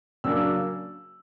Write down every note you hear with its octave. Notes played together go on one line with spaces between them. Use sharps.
C#3 F#3 A#3 D4 E6